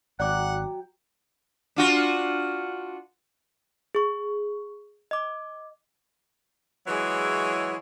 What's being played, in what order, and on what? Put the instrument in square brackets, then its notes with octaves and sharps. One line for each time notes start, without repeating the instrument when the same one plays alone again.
[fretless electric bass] G#1 [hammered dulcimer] F#3 G5 [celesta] D5 D6 F#6 [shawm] F#5
[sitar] D4 F4 F#4
[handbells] G#4 C#6
D#5 D6
[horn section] E3 F#3 G#3 E4 G#4 C#5